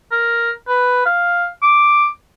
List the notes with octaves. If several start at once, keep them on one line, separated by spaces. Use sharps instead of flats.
A#4
B4
F5
D6